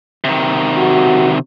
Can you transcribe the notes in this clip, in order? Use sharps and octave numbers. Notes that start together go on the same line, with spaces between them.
C3 D#3
F#4